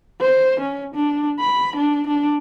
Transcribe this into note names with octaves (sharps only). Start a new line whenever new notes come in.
C5
C#4
D4
B5
D4
D4